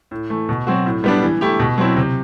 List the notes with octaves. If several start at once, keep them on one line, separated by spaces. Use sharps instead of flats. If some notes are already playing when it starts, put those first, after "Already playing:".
A2
E3 A3
B2
F#3 C4 F#4
A2
G3 B3 D4
E3
A3 E4 G4
B2
F#3 C4 E4
C3